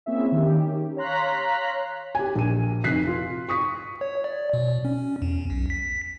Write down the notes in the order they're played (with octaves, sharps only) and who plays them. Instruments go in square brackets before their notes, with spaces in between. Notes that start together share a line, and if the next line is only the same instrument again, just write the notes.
[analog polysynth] A#3 C4 C#4 E4 G#4 E5
D#3 C#4 G4
C#5 F5 A#5 C6 F#6 B6
[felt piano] G4 G#5
A#1 D#7
F1 F#6 B6 C7
F4
C#6 D#6 B6
[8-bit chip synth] C#5
D5
B2
C#4
E2
B1
B6